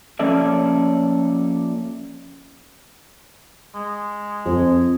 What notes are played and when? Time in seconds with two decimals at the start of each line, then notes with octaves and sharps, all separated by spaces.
0.19 F3 A#3 C#4 A4 D5 E5
3.74 G#3
4.46 F2